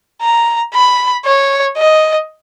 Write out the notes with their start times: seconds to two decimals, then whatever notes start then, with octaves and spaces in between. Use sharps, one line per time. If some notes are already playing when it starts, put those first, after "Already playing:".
0.22 A#5
0.74 B5
1.25 C#5
1.78 D#5